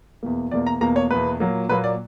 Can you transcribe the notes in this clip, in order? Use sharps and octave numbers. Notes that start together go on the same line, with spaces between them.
E2 B2 A#3
E2 B2 A#3 D5
A#5
E2 B2 A#3 A#5
C#5
E2 B2 A#3 B4
A#2 F#3 A#3
A#2 F#3 A#3 B4
D5